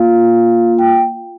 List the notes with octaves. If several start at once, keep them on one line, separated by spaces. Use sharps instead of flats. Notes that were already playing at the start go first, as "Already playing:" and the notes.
Already playing: A#3 F4 F5
G5